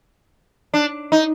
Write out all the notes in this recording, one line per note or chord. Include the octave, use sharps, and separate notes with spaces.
D4
D#4